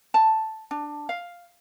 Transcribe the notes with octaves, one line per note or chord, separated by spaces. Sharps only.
A5
D4
F5